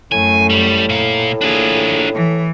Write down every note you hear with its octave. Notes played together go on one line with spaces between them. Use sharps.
F#2 A2 A3 G#5
G3
A#2 F5
A#3 D4 F4 G#4
E3